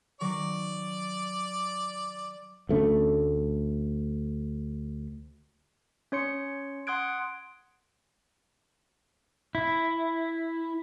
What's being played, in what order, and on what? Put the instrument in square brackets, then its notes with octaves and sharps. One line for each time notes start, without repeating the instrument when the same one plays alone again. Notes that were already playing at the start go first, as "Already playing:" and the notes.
[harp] D#3 F#3 C#6 [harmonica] D5 D6
[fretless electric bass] D2 A3 C#4
[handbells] C#4 C#5 C6 C#7
F#5 C6 D#6 F#6 G#6 D7
[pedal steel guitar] E4